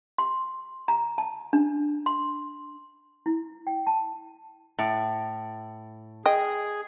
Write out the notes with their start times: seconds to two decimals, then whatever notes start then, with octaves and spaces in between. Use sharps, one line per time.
0.18 C6
0.88 A#5
1.18 A5
1.53 D4
2.06 C6
3.26 E4
3.67 G5
3.87 A5
4.79 A2
6.26 G#4 D#5 G5